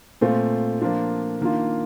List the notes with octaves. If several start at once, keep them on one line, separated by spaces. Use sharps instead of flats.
A#2 A3 C4 F4
F3 A#3 D4 F4
D#3 A#3 D4 F4